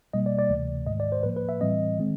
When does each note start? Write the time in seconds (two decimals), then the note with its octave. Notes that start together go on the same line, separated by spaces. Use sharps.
0.13 B2 G3 A#3 D#5
0.26 D5
0.39 D5
0.50 D2 C3 E3 A3
0.86 G#2 D#3 G#3 D#5
1.00 D5
1.12 C5
1.23 A2 F3 A#3 B4
1.37 B4
1.49 E5
1.61 A2 E3 G3 C4 D#5
1.98 D#3 G#3 C4